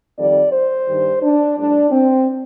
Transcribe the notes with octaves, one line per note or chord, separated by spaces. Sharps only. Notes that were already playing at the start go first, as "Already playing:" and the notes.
F2 D#3 G3 D5
C5
G2 D#3 G3
D4
A2 G3 D4
C4